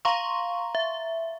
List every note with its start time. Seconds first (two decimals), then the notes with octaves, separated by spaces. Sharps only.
0.05 F5 A#5 C6 C#6
0.75 E5